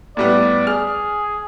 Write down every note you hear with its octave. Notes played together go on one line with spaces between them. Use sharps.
A2 G3 B3 D5
G#4 F6